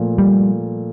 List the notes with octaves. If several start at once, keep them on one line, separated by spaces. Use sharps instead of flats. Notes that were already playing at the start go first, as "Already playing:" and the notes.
Already playing: A#2 F3 A3
G3